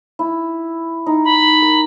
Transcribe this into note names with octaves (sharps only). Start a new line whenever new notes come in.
E4
D#4
B5
A#4